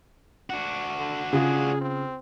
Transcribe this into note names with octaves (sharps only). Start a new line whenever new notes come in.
D4 F#4
D3
C#3 F4 G#4
C4